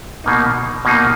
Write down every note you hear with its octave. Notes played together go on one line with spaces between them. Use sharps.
B2 A#3 D#4
B2 A#3 D#4